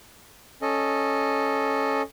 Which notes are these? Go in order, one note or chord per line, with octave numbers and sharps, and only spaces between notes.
C#4 A4 D#5